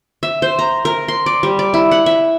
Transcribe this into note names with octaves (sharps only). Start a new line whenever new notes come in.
E5
C5
A#5
A#4
C6
D5
G3
D5
E4
F#5
E5